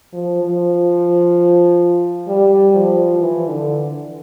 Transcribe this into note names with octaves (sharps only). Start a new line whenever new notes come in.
F3
F3
G3
F3
E3
D3